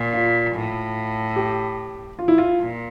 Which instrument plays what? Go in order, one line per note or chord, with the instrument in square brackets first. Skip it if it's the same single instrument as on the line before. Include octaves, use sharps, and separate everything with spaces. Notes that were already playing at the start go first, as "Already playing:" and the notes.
Already playing: [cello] A#2
[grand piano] F4
[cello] A2
[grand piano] G4
F4
E4
F4
[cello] A#2